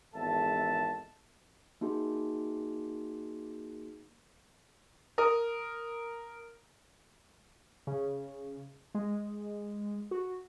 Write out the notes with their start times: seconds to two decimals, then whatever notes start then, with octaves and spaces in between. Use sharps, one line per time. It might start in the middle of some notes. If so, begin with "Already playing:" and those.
0.15 G#1 E2 A4 E5 A5
1.81 A#3 D#4 F#4 G#4
5.18 A#4 D#6
7.87 C#3
8.95 G#3
10.11 F#4